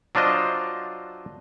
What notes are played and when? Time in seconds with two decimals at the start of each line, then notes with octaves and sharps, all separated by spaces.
0.15 F#3 D4 F4 C5 D#5